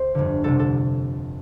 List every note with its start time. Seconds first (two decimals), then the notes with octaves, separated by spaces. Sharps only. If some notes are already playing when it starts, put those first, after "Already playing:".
Already playing: D2 C5
0.15 G1 F2 D3
0.44 C2 C3 A4
0.59 A4